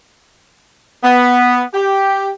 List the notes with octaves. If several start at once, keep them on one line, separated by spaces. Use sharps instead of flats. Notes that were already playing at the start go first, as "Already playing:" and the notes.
B3
G4